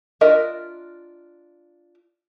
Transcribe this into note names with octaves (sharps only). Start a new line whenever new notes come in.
D4 F4 A#4 D#5 E5